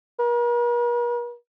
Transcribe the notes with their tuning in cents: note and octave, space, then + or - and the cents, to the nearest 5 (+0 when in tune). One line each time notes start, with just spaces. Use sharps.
A#4 +45